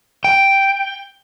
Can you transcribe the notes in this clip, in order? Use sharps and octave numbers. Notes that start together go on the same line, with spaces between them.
G5